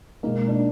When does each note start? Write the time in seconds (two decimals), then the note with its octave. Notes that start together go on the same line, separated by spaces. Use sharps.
0.23 B2 G#3 A#3 D#4
0.48 D4